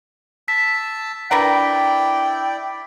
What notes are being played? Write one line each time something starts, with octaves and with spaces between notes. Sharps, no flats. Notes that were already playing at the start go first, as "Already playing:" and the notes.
A5 E6 B6
D4 E4 A#4 B4 D5 G5